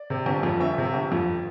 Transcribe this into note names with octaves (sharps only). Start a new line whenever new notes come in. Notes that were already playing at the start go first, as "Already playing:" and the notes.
Already playing: D5
C3
G1
F2
G1 E5
C3
G1
F2